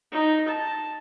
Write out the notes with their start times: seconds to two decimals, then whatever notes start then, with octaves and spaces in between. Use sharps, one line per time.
0.12 D#4
0.48 A5